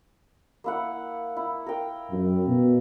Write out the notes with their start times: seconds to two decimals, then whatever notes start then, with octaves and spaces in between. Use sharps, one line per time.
0.64 A#3 E4 F#5
1.37 E4
1.66 A#4 G5
2.11 F#2
2.47 B2